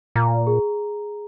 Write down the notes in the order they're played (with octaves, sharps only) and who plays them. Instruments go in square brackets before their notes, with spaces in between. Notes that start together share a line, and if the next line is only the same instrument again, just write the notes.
[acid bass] A#2 [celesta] A#5
[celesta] G#4